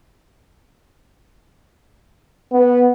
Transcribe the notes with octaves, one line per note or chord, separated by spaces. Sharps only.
B3